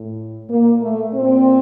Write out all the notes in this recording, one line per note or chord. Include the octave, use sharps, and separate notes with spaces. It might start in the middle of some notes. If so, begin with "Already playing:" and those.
Already playing: A2
A#2 A#3
A3
A#2 C4